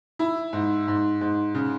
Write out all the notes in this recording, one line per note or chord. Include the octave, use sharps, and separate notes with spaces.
E4
G#2
G#2
G#2
C#3